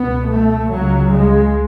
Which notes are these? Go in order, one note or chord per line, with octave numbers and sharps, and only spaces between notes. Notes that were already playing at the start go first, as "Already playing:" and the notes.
Already playing: C#2 B2 B3
A3
C#2 C#3 F#3
G#3